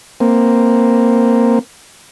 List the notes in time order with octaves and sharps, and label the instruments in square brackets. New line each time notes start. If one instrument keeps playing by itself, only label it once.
[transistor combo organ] A#3 C4